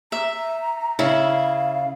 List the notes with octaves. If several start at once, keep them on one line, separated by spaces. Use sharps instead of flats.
E5 A#5
C#3 E4 F5